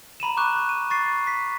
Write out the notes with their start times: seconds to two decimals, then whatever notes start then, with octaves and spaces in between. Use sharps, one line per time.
0.20 A#5 B5 D#7 E7
0.37 C#6 D6 F#6 E7
0.69 D#7
0.90 C#6 A6 C7
1.27 B6